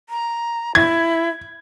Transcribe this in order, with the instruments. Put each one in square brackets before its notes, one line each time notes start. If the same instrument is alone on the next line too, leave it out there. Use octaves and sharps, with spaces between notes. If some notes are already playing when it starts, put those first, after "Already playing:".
[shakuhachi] A#5
[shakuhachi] E4 [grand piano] G#6